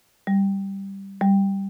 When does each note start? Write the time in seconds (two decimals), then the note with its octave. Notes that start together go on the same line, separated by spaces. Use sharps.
0.27 G3
1.21 G3